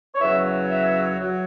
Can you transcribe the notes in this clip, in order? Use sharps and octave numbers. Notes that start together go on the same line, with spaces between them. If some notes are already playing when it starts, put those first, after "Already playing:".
C#5
E2 C#3 F#3 E5
E5
F#3